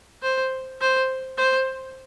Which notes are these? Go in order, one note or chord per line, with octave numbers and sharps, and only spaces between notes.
C5
C5
C5